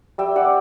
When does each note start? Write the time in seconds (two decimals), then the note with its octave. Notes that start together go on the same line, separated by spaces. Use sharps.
0.18 G3 E5 G5
0.36 D5 F#5
0.45 C4